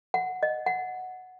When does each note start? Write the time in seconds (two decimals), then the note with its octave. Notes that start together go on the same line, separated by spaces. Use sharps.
0.14 F#5
0.43 D#5
0.66 F#5